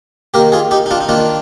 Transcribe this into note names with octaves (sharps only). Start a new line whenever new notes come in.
D#3 A#3 G4 A#4
F4 G#4
D#4 G4
D#4
D4 F4
D#4
D#3 A#3 D4 F4